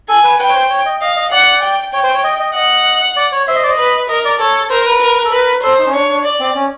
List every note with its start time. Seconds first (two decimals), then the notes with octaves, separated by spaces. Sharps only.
0.09 A4 G#5
0.24 B4
0.39 B4 G5
0.49 C#5
0.55 C5
0.70 C#5
0.86 D#5
1.01 D#5 F5
1.16 D#5
1.31 D5 F#5
1.63 G5
1.93 C#5 G5
2.04 C5
2.14 C#5
2.24 D#5
2.40 D#5
2.54 D#5 F#5
3.16 D5
3.32 C#5
3.47 C5 E5
3.56 D#5
3.63 D5
3.70 D#5
3.78 B4
4.09 A#4 D#5
4.25 D5
4.40 A4 C#5
4.70 A#4 C5
4.86 B4
5.02 A#4
5.25 A4
5.31 A#4 B4
5.63 A4 C5
5.79 D#4
5.87 C#4
5.93 D4 C#5
6.09 D4
6.25 D5
6.40 C4
6.55 C#4